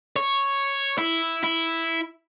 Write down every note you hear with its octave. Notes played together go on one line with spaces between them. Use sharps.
C#5
E4
E4